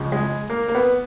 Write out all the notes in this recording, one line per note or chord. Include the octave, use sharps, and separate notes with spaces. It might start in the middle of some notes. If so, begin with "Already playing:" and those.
Already playing: C#2 C#3 F3
G#3
A#3
A#3
B3